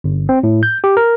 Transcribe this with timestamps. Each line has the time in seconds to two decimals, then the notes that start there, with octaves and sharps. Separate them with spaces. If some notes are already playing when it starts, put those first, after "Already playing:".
0.04 G1
0.29 C4
0.43 A2
0.63 G6
0.84 G4
0.97 A#4